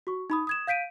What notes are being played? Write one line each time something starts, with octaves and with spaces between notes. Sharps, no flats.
F#4 C#6
D#4 B5 D#6
D#6 G#6 E7
F5 G6 B6 D7 D#7